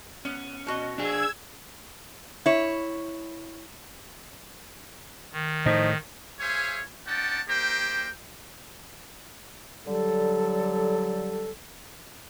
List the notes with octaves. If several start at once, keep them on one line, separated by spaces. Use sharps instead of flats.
B3 C#4
B2 F#4 D#5
D4 G#4 E6 G#6
E4 C#5
D#3
A2 F3 D#4
G#4 C5 C#5 E5 F5 G#5
C#4 D#4 D5 F#5 G5 A5
A#3 D#4 G4 A#4 C5 G5
D3 F#3 G3 G4 A4